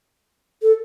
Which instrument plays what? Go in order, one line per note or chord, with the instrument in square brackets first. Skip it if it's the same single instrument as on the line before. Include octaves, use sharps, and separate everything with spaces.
[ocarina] A4